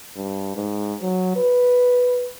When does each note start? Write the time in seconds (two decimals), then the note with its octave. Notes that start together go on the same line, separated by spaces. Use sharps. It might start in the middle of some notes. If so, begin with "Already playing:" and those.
0.17 G2
0.56 G#2
1.02 F#3
1.36 B4